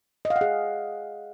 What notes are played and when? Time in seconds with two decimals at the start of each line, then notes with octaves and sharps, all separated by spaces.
0.25 D#5
0.30 F5
0.36 F#5
0.41 G#4